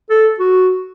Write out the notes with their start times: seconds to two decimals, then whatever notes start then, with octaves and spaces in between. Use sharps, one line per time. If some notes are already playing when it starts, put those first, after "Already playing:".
0.10 A4
0.39 F#4